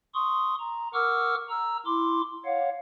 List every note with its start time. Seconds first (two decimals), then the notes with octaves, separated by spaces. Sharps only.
0.15 C6 C#6 D#6
0.60 A#5
0.94 A#4 F#5 C#6 D6 E6 F6
1.49 A#5 E6
1.86 E4 C6 D6
2.45 C#5 F5 F#5